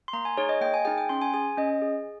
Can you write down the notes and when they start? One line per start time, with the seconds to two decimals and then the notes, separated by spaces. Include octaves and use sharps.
0.08 C6
0.13 A#3 A#5
0.25 G#5
0.37 D#4 G#4 C#5
0.49 D#5
0.61 A#3 G5
0.74 G#5
0.85 D#4 G#4 G5
0.98 G5
1.09 C#4 C6
1.21 G#5
1.33 G#4 G#5
1.57 C#4 D#5
1.82 G#4